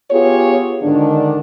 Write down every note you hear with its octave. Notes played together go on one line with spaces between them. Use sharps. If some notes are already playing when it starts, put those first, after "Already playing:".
B3 F4 G4 G#4 C#5
G#2 D3 D#3 D4